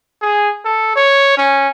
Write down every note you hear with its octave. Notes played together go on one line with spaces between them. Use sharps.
G#4
A4
C#5
C#4